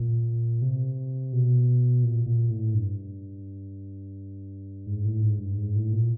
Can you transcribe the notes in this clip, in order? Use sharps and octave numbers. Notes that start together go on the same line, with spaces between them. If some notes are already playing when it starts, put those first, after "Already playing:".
Already playing: A#2
C3
B2
A#2
A#2
A2
G2
G#2
A2
G#2
G2
G#2
A2
A#2